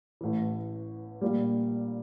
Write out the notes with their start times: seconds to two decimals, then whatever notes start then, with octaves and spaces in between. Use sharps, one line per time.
0.21 A1 A2 E3
1.21 A#1 A#2 G3